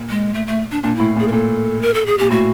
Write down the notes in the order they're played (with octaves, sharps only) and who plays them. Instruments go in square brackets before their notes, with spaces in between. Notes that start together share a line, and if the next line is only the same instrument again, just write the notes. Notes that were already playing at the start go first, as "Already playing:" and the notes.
Already playing: [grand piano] A#2
[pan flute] G#3
A3
A3
D4
[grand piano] A#2 [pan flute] D4
[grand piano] A2 [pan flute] E4
[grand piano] A#2
[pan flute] G#4
A#4
[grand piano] A#2 [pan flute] A4
[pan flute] A#4
A4
G#4
[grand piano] A#2 [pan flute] G4
[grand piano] A2 [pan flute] F#4